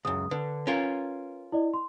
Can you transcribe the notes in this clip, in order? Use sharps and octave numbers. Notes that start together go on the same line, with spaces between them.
C#2 F#2 D#6
D3 B4
C#4 F4 A#4
E4 D5 D#5
C6